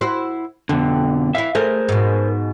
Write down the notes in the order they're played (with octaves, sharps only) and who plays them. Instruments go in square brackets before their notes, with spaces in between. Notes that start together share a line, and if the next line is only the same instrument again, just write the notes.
[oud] E4 F#4 C5
[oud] F2 [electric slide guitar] B2 D3
[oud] E3 E4 [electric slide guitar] E5 F5
[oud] A3 [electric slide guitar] G#4 A#4 C5
[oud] G#2 B2